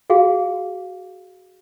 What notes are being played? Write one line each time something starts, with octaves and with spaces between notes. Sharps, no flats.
F#4 G#4 F5